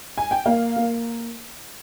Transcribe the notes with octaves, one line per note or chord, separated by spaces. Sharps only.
G#5
G5
A#3 F5
A#3